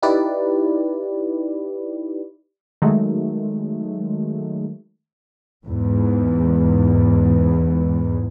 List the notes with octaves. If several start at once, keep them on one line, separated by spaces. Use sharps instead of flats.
D#4 E4 G4 B4 D5
D#3 F#3 G#3 A3
E2 G#2